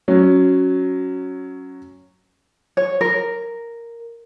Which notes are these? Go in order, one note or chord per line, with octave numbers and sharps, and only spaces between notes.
F#3 C#4
C#5
A#4